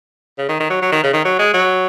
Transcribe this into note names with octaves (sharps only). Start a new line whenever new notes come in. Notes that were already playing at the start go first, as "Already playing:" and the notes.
C#3
D#3
D#3
F#3
F#3
D#3
C#3
D#3
F#3
G#3
F#3